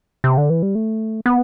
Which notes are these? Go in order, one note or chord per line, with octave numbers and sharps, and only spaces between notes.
C3
D3
E3
G3
A3
B3